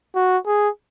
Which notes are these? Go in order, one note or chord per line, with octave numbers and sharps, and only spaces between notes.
F#4
G#4